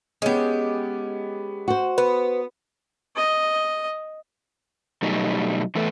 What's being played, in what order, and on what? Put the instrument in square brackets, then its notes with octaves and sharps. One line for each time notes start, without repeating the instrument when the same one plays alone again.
[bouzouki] G#3 G4 [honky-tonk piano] B3 C#4
[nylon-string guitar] F#4 C5
[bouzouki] B3 [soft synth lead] B4
[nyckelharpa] D#5
[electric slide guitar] B2 F#3 G3 A3 D#4
E3 A3 B3 A4 B4